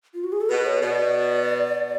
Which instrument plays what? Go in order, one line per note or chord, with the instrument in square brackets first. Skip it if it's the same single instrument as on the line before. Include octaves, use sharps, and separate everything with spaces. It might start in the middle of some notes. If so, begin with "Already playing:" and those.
[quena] F4
F#4
G#4
A4
[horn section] B2 [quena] B4
[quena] C#5
[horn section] B2 [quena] D5